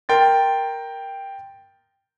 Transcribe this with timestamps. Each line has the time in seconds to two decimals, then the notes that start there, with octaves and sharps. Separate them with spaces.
0.09 A#4 G5 C6 A6